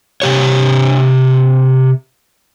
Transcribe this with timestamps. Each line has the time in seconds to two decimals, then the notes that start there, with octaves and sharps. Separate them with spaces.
0.22 C3 G4 C#5